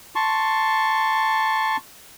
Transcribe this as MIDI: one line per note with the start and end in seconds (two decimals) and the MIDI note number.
0.15 1.77 81
0.15 1.77 84
0.15 1.77 85